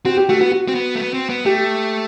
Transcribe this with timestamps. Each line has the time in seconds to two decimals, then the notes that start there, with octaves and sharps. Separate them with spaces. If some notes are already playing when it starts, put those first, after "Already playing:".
0.05 C4 F#4
0.17 G4
0.29 A3 F#4
0.40 B3 F#4
0.52 F#4
0.68 C4
0.75 B3
0.95 A3
0.98 B3
1.14 C4
1.29 B3
1.45 A3 G4